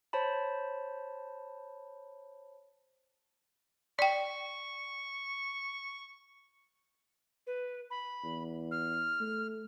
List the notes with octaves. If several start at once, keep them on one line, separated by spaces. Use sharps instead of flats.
C5 C#5 A5 B5
D5 G5 C#6
B4
B5
E2
F6
A3